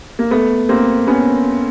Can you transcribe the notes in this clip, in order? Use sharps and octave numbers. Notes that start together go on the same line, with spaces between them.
A#3
A3 B3
A#3 C4
B3 C#4